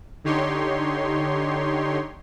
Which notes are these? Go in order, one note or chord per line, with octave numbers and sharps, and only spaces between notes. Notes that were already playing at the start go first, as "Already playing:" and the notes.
D3 D#4 G4 C#5 C6